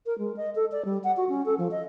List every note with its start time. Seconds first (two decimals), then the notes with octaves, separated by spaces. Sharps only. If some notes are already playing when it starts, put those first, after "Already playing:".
0.06 A#4
0.19 G#3
0.37 D#5
0.55 A4
0.72 D5
0.85 G3
1.04 F#5
1.17 F#4
1.29 C#4
1.46 A4
1.58 F3
1.71 D#5